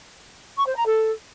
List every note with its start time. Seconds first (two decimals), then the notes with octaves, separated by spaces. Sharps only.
0.57 C#6
0.66 C5
0.76 A#5
0.86 A4